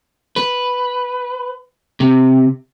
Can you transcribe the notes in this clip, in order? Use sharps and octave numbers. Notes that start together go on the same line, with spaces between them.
B4
C3